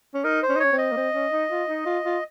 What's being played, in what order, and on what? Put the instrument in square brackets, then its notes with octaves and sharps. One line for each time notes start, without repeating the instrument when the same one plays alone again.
[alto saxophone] C#4
[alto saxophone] D#4 [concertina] A#4
[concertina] C5
[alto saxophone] C#4
D#4
[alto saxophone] C#4 [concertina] C#5
[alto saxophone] C4
[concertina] D#5
[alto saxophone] A#3
C4
C#4
D#4
F4
D#4
F4
F4